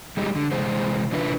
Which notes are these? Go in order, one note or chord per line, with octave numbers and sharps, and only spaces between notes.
G3 G#3 D#4 E4 G4 G#4
D3
C3 E3 G#3 C5
D3 E3 D4 E4 F4 B4